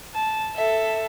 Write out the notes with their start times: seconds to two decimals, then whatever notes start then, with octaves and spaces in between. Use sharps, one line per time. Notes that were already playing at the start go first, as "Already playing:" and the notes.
0.14 A5
0.55 A4 E5